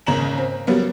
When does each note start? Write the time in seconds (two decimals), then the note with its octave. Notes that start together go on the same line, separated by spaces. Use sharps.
0.06 G#1 C#3 A#3 A#5 E7 F#7
0.38 C4
0.67 F#3 G3 A#3 B3